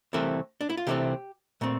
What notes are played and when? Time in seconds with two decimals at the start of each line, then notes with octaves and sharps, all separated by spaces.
0.13 C2 C3 E3 A3 C4 A#4
0.61 D4
0.70 E4
0.77 F4
0.87 C2 C3 E3 A3 C4 G4
1.61 A#2 A3 C4